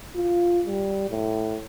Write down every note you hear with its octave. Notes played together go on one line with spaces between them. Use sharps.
F4
G3
A2